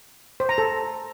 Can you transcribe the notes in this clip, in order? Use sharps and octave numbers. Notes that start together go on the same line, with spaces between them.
C5
A#5
A4